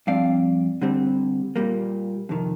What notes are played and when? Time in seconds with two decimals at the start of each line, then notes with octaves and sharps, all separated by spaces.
0.07 G2 F3 C4 D5 F5
0.82 D3 G3 C4
1.56 A#2 G3 A#3
2.29 F2 C3 D#3